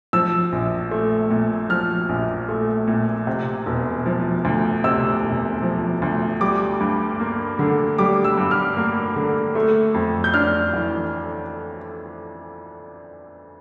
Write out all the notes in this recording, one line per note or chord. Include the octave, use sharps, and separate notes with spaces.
F3 E6
A#1
A3
A#2
F3 F6
A#1
A3
A#2
C3
E1
F3
D2
C3 E6
E1
F3
D2
G3 D6
G2
A#3
D3
G3 D6
E6
G2
F6
A#3
D3
A3
F2
G6
D4 F6
E3